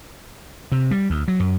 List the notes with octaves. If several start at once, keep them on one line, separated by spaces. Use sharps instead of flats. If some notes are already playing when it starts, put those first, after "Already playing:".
C3
G3
D2
F#3
F#2